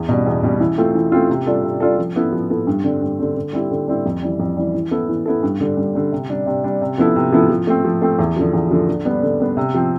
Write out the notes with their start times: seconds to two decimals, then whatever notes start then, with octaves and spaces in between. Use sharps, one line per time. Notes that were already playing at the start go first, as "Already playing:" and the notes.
Already playing: E2
0.09 B2 G3
0.26 E2
0.43 B2 G3
0.60 E3
0.78 A3 C4 F4
0.95 E3
1.12 A3 C4 F4
1.30 C3
1.46 G3 D4 F4 A4
1.64 C3
1.80 G3 D4 F4 A4
1.98 F3
2.16 B3 E4 A4
2.33 F3
2.50 B3 E4 A4
2.67 G2
2.84 D3 G3 C4
3.02 G2
3.19 D3 G3 C4
3.36 D3
3.53 G3 C4 E4 G4
3.71 D3
3.88 G3 C4 E4 G4
4.06 F2
4.22 E3 G3
4.39 F2
4.57 E3 G3
4.74 E3
4.91 B3 E4 A4
5.09 E3
5.26 B3 E4 A4
5.43 G2
5.60 D3 G3
5.77 G2
5.95 D3 G3
6.12 C3
6.30 G3 D4
6.46 C3
6.64 G3 D4
6.81 C3
6.98 F3 B3 E4 A4
7.16 C3
7.32 F3 B3 E4 A4
7.50 F3
7.67 A3 C4
7.85 F3
8.02 A3 C4
8.19 E2
8.37 D3 F3
8.53 E2
8.71 D3 F3
8.88 D3
9.05 G3 B3 D4
9.23 D3
9.40 G3 B3 D4
9.57 C3
9.74 F3 C4